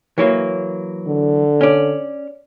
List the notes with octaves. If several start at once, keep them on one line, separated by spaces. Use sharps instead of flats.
E3 F#3 A#3
D3
C#4 D5